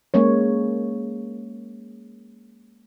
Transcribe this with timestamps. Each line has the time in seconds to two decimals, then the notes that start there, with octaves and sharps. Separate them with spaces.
0.14 G#3 A#3 C#4 C#5